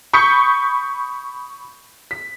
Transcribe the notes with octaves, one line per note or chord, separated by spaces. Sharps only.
B5 C#6 D#6 G6 B6 C#7
B6